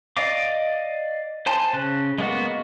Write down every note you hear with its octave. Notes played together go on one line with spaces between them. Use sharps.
D5 D#5 F5 D6
C5 G#5 A5 C6
C#3 F#6
G#3 A#3 B3 F#4